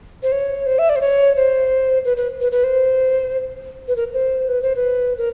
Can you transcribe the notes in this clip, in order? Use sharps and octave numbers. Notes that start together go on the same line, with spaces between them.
C5
C#5
C5
E5
D5
C5
C#5
C5
B4
B4
B4
B4
C5
B4
A#4
C5
B4
C5
B4
A#4